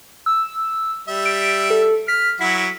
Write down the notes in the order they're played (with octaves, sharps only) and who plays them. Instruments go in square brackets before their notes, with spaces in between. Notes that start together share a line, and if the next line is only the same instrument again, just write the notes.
[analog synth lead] E6
[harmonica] G3 E5
[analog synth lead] D7
A4
[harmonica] F6 [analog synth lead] B6
[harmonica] F#3 E4 F#4 [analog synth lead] B6